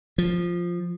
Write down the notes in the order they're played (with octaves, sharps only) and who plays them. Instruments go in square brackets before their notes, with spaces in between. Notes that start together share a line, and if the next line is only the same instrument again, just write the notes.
[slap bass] F3